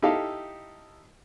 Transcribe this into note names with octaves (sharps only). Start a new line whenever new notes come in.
D#4 E4 G4 A4 F5